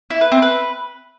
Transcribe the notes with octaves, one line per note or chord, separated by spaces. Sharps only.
E4
B4
C4
B4